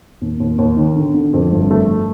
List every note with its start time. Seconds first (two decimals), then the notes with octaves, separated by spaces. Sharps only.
0.21 D#2
0.40 D#2
0.58 D#2
0.77 D#3
0.96 D3
1.14 D3
1.33 F2
1.52 G1
1.71 A3